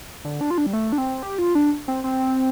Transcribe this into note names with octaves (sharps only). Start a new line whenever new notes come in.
D3
D4
F4
D4
G3
A3
D4
C4
G4
F4
D4
C4
C4